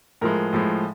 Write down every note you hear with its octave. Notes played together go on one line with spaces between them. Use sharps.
A2 F3 G#3 A#4
A2 F3 G#3